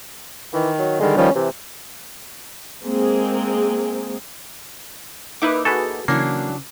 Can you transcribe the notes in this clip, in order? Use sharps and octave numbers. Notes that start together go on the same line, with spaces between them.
D#3 E3
F#3
D3 D#3 G3 G#3
D#3 F3 G3 C#4
C3 E3
G#3 A#3 C4 G#4
A#3 D#4 E4 B4 E5 D6
F#4 G#4 A4 B4
C#3 E3 F#3 A#3 D4 C7